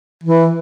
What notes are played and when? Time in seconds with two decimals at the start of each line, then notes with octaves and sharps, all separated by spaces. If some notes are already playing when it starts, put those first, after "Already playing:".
0.24 E3